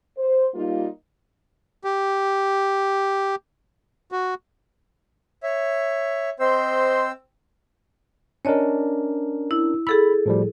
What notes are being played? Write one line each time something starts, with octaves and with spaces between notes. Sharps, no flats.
C5
G3 A#3 D#4 F4
G4
F#4
C#5 E5
C4 C5 D#5 C6 E6
C#4 D4 A#4 C#5 D#5
E4
G#4 A4 B5 E6
A2 F3 G3